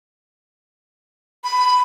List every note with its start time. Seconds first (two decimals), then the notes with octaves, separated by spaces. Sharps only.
1.44 B5